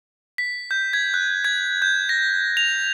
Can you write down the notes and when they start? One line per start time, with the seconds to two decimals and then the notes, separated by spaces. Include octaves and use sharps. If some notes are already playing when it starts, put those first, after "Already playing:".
0.38 B6
0.71 G6
0.93 G#6
1.14 F#6
1.45 G#6
1.82 G6
2.09 A#6
2.57 F7